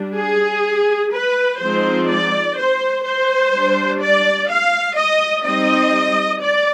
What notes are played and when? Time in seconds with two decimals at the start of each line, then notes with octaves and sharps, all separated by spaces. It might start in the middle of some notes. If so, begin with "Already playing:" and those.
Already playing: G3 D4
0.17 G#4
1.14 B4
1.61 F3 G#3 C4 D#4 C5
2.10 D5
2.58 C5
3.05 C5
3.53 G3 D4
4.02 D5
4.50 F5
4.97 D#5
5.45 G3 C4 D#4 D#5
6.41 D5